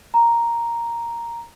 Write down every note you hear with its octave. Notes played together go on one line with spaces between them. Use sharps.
A#5